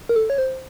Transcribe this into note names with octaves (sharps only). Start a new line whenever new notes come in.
A#4
A4
C#5
C5